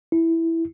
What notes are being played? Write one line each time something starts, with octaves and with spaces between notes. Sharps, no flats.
E4